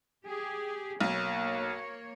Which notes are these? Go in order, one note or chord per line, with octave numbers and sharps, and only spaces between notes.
G4 G#4
B1 A#3 C#5